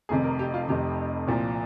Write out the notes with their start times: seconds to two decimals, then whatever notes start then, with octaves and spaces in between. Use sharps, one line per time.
0.09 F1 F2 C3 G#4
0.24 A#4
0.39 G4
0.54 F4
0.68 F1 F2 C3 G4
1.27 C2 A#2 F3